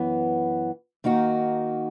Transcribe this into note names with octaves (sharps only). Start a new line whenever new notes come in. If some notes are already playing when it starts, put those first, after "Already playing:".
Already playing: F#2 E3 B3
D#3 A#3 D#4 F#4